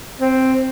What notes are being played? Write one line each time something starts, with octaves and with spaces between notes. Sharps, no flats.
C4